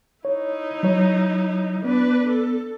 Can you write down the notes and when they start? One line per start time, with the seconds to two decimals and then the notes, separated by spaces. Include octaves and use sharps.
0.25 D#4 E4 C#5
0.83 F#3 C#5
1.84 B3 D4 B4
2.29 A4